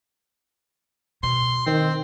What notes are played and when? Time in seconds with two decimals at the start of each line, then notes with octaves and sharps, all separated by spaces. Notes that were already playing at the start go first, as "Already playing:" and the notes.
1.23 B2 C6
1.67 D#3 C4